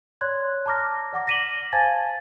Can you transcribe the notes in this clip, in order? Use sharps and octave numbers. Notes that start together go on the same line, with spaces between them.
C#5 D5 C6 F#6 G#6
A5 A#5 D6 F6 A#6
D5 F#5 D6 A#6
A#6 B6 D#7 E7 F#7 G7
C5 F5 G#5 A5 G#6 A6